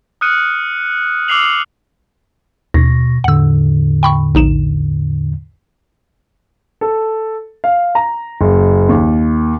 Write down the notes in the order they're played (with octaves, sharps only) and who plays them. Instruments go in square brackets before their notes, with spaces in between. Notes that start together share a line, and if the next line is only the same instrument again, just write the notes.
[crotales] D#6 F6 F#6 C#7 D#7
D6 E6 F6 C7 F7 F#7
[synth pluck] D#2 [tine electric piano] B2 C#6 A#6
[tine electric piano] E2 A2 D3 [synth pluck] F#5 E6
[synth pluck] G5 B5 C#6
A#1 D#4 E7
[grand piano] A4
F5
A#5
F#1
D#2